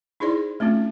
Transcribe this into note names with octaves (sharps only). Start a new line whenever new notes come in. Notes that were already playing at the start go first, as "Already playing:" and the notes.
D#4 E4 G#4 C5 D5 C6
A3 C4 C#4 F4